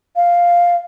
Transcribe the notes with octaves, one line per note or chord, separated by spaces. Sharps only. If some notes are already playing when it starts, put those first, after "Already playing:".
F5